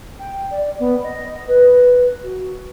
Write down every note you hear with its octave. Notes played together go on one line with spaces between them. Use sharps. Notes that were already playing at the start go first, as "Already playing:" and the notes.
G5
D5
B3
D#5
B4
F#4